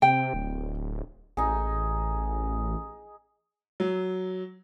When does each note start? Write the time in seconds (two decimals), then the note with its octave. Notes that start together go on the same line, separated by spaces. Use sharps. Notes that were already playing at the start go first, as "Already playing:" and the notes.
0.02 C3 G5
0.34 D1
1.37 A1 D#4 G#4
3.80 F#3